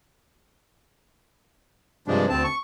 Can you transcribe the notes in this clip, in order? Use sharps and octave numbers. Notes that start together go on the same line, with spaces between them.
G2 C3 F3 G#3 D4
D2 C4 A5
C#6